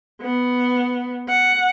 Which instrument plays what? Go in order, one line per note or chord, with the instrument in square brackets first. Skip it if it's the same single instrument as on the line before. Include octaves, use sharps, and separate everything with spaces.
[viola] B3
F#5